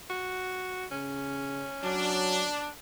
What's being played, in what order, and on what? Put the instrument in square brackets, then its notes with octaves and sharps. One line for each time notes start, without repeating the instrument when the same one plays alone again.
[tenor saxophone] F#4
[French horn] C#3 [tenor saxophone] C#4
[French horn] F#3 [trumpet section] D4